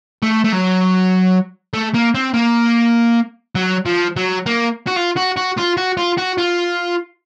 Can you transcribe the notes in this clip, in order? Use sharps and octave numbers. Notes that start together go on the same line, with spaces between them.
A3
A3
F#3
A3
A#3
C4
A#3
F#3
F3
F#3
A#3
F#4
F4
F#4
F#4
F4
F#4
F4
F#4
F4